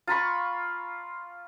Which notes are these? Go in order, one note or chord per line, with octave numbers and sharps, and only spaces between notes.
F4 A#5 B5 C#6